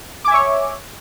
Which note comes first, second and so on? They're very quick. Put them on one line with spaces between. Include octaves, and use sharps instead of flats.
D6 G#5 E5 C#5